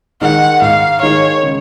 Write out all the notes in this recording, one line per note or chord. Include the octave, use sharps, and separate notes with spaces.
D#3 G#3 D#4 F#5
G#2 F5
D#3 G#3 D#4 C#5
C#3